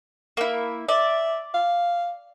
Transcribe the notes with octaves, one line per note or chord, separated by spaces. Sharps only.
A#3 E4
D5 E5
F5